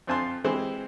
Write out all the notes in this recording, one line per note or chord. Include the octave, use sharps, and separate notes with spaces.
F2 C4 F4 G#5 A5 C6
E3 G#3 C4 G4 C5